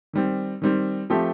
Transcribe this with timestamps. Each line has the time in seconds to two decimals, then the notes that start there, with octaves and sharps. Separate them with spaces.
0.13 D#3 G3 C4
0.62 D#3 G3 C4
1.10 F3 A3 C4 G4